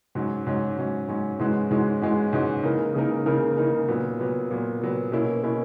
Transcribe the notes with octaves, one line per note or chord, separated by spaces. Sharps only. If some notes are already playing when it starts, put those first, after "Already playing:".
G#2 F#3 C#4
G#2 F#3 C#4
G#2 F#3 C#4
G#2 F#3 C#4
G#2 E3 G#3 C#4 F#4
G#2 E3 G#3 C#4 F#4
G#2 E3 G#3 C#4 F#4
G#2 E3 G#3 C#4 F#4
C#3 E3 A#3 D#4 A#4
C#3 E3 A#3 D#4 A#4
C#3 E3 A#3 D#4 A#4
C#3 E3 A#3 D#4 A#4
A#2 F#3 B3
A#2 F#3 B3
A#2 F#3 B3
A#2 F#3 B3
B2 A#3 C#4 E4
B2 A#3 C#4 E4